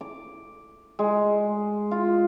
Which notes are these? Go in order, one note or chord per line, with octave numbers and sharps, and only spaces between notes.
D6
G#3
F4